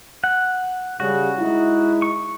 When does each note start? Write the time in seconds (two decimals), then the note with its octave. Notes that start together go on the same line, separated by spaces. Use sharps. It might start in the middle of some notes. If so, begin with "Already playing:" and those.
0.24 F#5
1.00 C#3 G3 F#4
1.39 G#3 D#4 E4
2.02 C#6